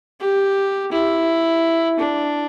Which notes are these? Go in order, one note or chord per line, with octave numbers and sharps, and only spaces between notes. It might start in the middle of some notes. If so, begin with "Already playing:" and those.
G4
E4
D4